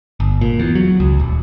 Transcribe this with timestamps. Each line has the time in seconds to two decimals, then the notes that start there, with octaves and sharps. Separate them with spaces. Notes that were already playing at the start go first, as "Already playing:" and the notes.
0.20 G1
0.41 A#2
0.60 E2
0.75 F#3
1.00 C#2
1.20 D#1